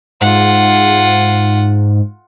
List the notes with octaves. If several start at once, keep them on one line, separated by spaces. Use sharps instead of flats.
G#2 F4 F#5